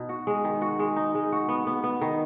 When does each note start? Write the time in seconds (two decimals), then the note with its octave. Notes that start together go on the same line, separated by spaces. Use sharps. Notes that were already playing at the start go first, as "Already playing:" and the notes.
Already playing: B2 D#4
0.09 F#4
0.27 G#3
0.44 D#3
0.62 F#4
0.79 G#3
0.96 D#4
1.15 G#3
1.32 F#4
1.49 B3
1.67 B3
1.84 B3
2.01 D#3